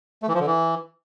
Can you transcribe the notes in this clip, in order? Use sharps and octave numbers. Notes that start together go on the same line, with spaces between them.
A3
E3
F3
D3
E3